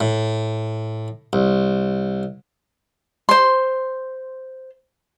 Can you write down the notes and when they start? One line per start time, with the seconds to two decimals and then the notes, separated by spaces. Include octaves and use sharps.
0.01 A2
1.33 C2
3.29 C5 C6